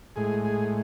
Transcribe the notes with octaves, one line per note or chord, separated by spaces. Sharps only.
A2 G#3 G#4
G#4